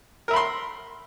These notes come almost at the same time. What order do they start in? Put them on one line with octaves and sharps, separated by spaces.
A#4 E5 B5 C6